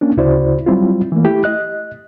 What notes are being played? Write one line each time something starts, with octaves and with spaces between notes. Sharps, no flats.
A#3 C#4 D4
D2 C#3 E4 F#4 C5 D5
F#3 G3 C4 E4 F4
E3 A3 A#3
A3 E4 G4
D#5 F#6